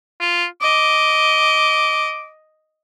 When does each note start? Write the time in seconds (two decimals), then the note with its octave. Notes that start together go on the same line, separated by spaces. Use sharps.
0.20 F4
0.62 D#5 D6